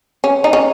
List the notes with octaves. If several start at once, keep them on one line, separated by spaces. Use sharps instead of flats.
C#4
D#4
C#4